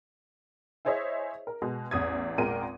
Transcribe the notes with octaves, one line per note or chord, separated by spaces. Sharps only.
E4 G#4 C5 C#5 D#5 E5
A#4
B2 G#3
A1 E2 D#6 G#6
G#1 A#2 G#3 A#4 G5 D#7